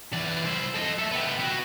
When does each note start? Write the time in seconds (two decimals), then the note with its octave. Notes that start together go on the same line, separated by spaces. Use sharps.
0.13 E3 D5
0.45 E4 C5
0.74 A4 D#5
0.98 A4 E5
1.11 B3 G4
1.40 B3 F#4